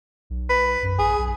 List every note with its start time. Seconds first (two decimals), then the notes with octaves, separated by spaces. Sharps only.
0.30 B1
0.50 B4
0.83 F#2
0.99 A1 G#4
1.18 B1